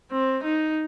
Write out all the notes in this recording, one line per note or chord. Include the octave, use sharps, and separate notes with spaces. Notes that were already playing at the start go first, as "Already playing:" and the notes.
C4
D#4